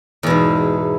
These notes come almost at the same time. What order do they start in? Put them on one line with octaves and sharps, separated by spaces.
E2 B2 G#2